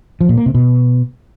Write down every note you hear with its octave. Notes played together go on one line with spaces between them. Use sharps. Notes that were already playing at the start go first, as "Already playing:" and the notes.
F3
A#2
A#3
C3
B2